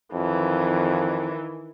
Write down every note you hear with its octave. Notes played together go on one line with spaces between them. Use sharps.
F2 D#3 E3